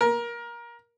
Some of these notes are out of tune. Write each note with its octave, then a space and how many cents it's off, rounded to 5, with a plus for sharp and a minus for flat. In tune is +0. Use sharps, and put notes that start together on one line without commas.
A#4 +20